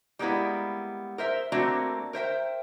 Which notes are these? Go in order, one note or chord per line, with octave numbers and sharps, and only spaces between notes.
G3 G#3 A#3 B3 E4
A#4 C5 E5
A3 A#3 C4 D4 F#4
A#4 C5 E5 G5